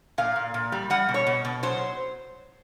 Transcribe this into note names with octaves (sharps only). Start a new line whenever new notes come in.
A#2 F5
A#2
A#2
G3
G3 F#5
B2
C#5
B2
B2
F#3 C5